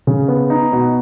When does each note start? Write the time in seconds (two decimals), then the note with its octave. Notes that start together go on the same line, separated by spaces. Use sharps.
0.07 C#3
0.28 B3
0.50 D#4
0.73 B2